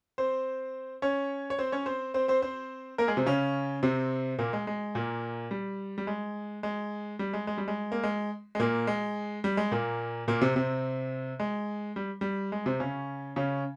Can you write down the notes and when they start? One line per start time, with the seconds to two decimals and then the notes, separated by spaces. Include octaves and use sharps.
0.18 C4 C5
1.02 C#4 C#5
1.50 C#5
1.59 C4 C5
1.72 C#4 C#5
1.86 C4 C5
2.14 C4 C5
2.28 C4 C5
2.42 C4 C5
2.98 A#3 A#4
3.08 G#3 G#4
3.17 C3 C4
3.26 C#3 C#4
3.83 C3 C4
4.39 A#2 A#3
4.53 G#3
4.67 G#3
4.95 A#2 A#3
5.51 G3
5.98 G3
6.07 G#3
6.63 G#3
7.19 G3
7.33 G#3
7.47 G#3
7.58 G3
7.68 G#3
7.92 A#3
8.03 G#3
8.55 G#3
8.59 A#2 A#3
8.87 G#3
9.44 G3
9.57 G#3
9.72 A#2 A#3
10.28 A#2 A#3
10.41 C3 C4
10.56 C3 C4
11.40 G#3
11.96 G3
12.21 G3
12.52 G#3
12.66 C3 C4
12.80 C#3 C#4
13.36 C#3 C#4